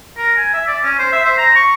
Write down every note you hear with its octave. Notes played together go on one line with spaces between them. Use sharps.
A#4
G#5
E5
D5
C#4
C5
E5
C5
A#5
C#6